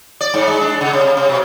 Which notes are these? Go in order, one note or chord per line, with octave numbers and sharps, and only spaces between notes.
D5
G#2
G#3
D4
C#3
C3
C3
B2